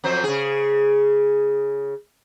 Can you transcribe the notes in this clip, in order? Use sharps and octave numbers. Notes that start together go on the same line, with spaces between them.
F2 F#3 C5
C#3 G#4